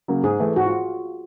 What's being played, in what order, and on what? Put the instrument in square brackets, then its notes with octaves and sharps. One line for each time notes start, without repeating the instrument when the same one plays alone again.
[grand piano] C#3 F#3 A#3
[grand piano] G#2 [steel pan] G#4
[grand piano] E3 A3
[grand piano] G#2 [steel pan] F#4
[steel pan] F4